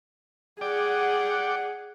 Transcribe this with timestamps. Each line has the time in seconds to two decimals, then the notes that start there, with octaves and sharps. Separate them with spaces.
0.61 G#4 D5 F#5 G5